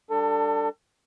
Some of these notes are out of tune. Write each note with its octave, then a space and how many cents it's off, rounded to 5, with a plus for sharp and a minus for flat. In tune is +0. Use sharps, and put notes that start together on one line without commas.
G3 +0 D4 +0 A4 +30